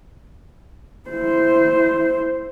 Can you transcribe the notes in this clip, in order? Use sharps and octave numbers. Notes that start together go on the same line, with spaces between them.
E4 C5